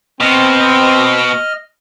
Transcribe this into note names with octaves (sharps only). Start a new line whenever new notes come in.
B2 C4 D#5 F6